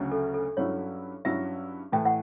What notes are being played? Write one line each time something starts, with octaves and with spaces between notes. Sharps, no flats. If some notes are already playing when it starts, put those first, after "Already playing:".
Already playing: D2 C#3 F#3
A4
A4
G2 F#3 C#4 E4 C#5
G2 F#3 C#4 E4 E5
A2 E3 A3 G5
F#5